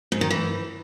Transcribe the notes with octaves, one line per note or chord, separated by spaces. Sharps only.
G#2
D#3
E3